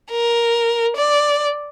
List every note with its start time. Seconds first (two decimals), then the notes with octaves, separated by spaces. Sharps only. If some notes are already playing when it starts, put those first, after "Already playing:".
0.11 A#4
0.97 D5